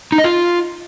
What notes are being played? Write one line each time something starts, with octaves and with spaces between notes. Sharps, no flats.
D#4
D#5
F4